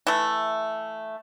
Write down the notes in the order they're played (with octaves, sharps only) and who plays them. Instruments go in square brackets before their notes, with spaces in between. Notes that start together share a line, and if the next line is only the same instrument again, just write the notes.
[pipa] E3 A3